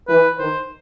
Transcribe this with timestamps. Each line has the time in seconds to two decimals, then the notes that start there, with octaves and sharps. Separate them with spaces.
0.08 E3 B4
0.39 D#3 C5